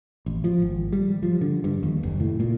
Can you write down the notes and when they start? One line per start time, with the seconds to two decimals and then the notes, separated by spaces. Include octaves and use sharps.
0.26 A1
0.44 F3
0.62 G#1
0.92 G3
1.23 F3
1.41 D3
1.64 G2
1.83 D#2
2.03 F#1
2.20 A2
2.40 A#2